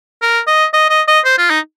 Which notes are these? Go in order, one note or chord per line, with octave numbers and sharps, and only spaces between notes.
A#4
D#5
D#5
D#5
D#5
C5
F4
D#4